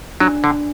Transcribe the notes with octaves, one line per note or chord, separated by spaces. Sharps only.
F#3 D4
D3